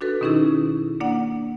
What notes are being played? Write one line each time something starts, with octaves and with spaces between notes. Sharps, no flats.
D4 F#4 A4 B4
B2 D#3 C#4 D#4 E4 G#4
A#3 D4 D5 F#5